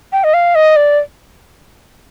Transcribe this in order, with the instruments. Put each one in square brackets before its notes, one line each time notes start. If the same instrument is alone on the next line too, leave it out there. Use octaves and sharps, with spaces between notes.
[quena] G5
D#5
F5
D#5
D5